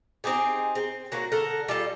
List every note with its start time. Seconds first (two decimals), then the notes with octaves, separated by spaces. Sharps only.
0.24 C4 D#4 G4 G#4
0.75 C4
1.12 F#3 A#3 F#4
1.32 D3 A4 A#4 F#5
1.68 G3 F4 A4